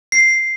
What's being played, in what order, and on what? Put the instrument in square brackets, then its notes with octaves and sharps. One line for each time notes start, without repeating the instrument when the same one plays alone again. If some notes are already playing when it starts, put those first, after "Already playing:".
[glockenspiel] C7